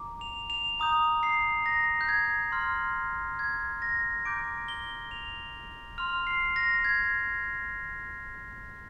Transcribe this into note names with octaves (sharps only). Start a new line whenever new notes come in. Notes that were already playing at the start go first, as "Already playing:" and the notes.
Already playing: A#5 D6
F7
F7
A#5 D#6 G6 F7
C7
A#6
G6
G#6
C6 F6
G#6
A#6
A#5 D6 G6 D7
G7
F7
C6 F6 F7
C7
A#6
G#6